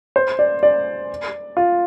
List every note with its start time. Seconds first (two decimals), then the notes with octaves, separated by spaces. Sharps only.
0.16 C5
0.39 D5
0.63 D5
1.57 F4